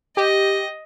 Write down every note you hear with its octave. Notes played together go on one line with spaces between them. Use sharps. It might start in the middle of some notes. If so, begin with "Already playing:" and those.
G4 D#5